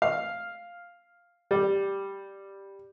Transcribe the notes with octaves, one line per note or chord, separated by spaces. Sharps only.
F5
G3